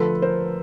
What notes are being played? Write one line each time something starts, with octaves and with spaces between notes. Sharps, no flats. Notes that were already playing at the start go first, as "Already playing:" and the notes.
Already playing: D3 F3 A3 A4 B4
A#4 C5